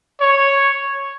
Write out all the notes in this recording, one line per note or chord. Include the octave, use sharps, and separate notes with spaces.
C#5